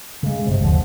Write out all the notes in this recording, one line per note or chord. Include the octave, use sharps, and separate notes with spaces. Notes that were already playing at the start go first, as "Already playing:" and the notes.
C#3 G#3
G1 C3
D#2 D3 F3